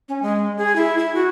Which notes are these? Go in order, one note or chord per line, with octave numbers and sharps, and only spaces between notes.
C#4
G#3
G#4
E4
E4
F#4